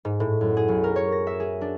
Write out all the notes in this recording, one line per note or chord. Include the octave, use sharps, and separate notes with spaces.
G#2
A2
F#2
G#4
B1
A#4
C#5
A#6
E5
G#4
D4